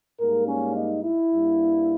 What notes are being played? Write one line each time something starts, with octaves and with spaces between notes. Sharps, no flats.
G#2 G3 A#3 A#4
C#4
D#4
E4
G2 G3 A#3